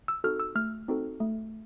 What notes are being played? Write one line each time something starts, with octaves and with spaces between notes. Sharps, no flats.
E6
C4 D#4 F#4 A4 F6
E6
A3 F6
C4 D#4 F#4 A4
A3